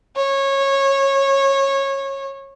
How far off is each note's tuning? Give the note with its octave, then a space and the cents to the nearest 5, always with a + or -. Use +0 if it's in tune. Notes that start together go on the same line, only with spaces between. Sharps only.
C#5 -20